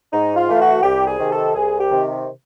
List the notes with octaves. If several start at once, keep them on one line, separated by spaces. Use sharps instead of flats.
G#2 D#4
F4
E3 A3
F#4
C2 G4
G#4
C3 D#3
A4
C2 G#4
G4
C3 D#3